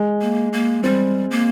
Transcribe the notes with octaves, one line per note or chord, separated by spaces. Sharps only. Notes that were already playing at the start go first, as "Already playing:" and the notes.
Already playing: G#3
A#3
A#3
G3 C4
A#3